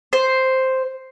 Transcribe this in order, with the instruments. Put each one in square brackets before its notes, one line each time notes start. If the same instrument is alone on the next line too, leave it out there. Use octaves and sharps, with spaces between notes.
[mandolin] C5